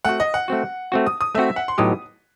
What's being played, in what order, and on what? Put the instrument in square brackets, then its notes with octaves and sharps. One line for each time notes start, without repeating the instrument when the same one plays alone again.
[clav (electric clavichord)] A3 C4 F#4 [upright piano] F#5
[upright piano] D#5
F#5
[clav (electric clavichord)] A3 C4 F#4
A3 C4 F#4
[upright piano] D#6
D#6
[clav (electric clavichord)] A3 C4 F#4 [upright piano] E5
[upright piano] F#5
C6
[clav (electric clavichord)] A2 F#3 B3 D#4 G4 [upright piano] D#6